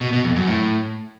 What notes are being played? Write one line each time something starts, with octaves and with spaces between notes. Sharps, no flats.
B2
B2
F2
F#2
A2